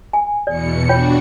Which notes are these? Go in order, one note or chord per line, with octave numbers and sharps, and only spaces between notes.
G#5
E2 B2 D5 C#7
D4 F4 F#4 C#5 G5